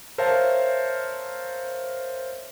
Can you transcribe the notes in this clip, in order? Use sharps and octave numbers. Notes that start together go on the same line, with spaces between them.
A#4 C5 C#5 E5 F5 A5